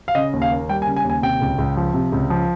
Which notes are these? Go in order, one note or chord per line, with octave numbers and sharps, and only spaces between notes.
F5
C#3 D#5
D#2
F5
A#3
G3 G5
G#5
C#3
G#5
D#2
G#5
C3 G5
C#2
C#2
F3
C3
C#2
F3